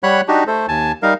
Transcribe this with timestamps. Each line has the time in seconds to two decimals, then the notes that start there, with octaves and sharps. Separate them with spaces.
0.03 G3 C#5 F#5 B5 F#6
0.28 D4 D#4 F#4 G4
0.47 A3 A4 C5
0.68 D#2 G#5 A5
1.03 G3 D#4 A#4 F5